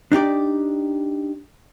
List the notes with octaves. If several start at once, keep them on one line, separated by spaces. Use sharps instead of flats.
D4 D#4 G4 D5